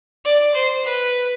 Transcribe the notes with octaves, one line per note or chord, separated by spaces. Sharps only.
D5
C5
B4